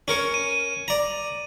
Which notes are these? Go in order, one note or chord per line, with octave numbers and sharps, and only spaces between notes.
C#4 A#4 C#5
D#7
D5 A#5